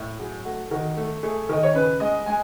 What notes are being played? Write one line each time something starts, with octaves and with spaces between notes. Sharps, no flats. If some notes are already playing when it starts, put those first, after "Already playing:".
Already playing: A2
F#3 G#4
A3 F#4
D#3 F#4
A3
A3 G#4
D#3 D#5
C#5
C#3 B4
G#3 D#5
G#3 G#5